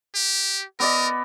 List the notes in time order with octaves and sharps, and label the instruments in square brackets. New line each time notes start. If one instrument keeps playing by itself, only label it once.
[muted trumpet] G4
[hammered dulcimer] B3 D5 D#5 [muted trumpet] A#4